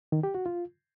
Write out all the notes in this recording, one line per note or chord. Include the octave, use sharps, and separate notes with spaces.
D#3
G4
F#4
F4